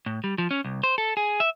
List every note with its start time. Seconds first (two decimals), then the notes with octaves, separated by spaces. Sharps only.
0.06 A2
0.24 G3
0.38 F3
0.51 C#4
0.65 C2
0.84 C5
0.98 A4
1.17 G#4
1.40 E5